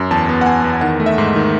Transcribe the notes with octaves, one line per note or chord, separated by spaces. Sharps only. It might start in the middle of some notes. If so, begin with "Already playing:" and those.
Already playing: F#2
E2 A5
B3
F#5
B3 G#5
E2
D#3 F#5
A3
E5
G#2
D#3